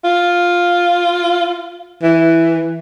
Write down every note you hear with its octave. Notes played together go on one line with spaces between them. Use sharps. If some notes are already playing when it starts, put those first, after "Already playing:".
F4
E3